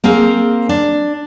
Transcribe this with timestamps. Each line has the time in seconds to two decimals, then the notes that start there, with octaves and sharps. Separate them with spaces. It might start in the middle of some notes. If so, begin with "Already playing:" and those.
0.04 A#3 C4 G#4 F5
0.69 D4